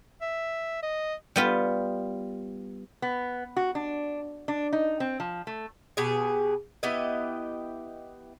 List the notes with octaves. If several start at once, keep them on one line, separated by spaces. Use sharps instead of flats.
E5
D#5
G3 B3 F4
B3
F#4
D4
D4
D#4
C4
F3
A3
B2 G4 G#4
B3 E4 G4 D#5